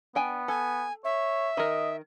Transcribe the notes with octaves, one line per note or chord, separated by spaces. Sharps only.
B3 D4 G5 G#5
A4 G#5
C#5 E5
D#3 A#4 D#5